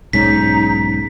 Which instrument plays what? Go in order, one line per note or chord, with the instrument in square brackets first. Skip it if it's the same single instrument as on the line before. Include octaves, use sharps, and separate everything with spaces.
[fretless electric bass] B1 G#2 C#4 [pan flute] D#4 [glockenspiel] B6